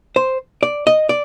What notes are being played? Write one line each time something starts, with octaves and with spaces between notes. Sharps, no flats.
C5
D5
D#5
D5